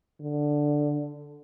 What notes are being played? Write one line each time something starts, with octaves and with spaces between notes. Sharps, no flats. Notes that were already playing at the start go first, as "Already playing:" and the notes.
D3